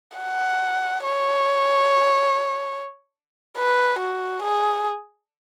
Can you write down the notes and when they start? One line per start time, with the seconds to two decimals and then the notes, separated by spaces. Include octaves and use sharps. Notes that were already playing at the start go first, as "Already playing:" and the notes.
0.18 F#5
1.03 C#5
3.57 B4
3.99 F#4
4.42 G#4